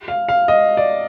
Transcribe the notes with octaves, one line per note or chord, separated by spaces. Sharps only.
F5
F5
D#5
D5